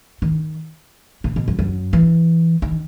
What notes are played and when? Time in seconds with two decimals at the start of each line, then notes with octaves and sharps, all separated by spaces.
0.22 D#3
1.24 B2
1.36 B2
1.48 F#2
1.59 F#2
1.93 E3
2.62 D#3